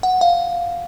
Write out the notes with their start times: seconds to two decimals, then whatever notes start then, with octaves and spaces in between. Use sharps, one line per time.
0.03 F#5
0.21 F5